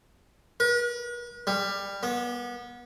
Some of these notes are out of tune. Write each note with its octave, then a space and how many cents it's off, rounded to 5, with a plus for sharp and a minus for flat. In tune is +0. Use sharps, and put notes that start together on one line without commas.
B4 -45
G3 +15
B3 -30